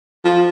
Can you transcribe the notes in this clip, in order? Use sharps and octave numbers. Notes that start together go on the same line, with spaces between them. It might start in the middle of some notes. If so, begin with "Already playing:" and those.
F3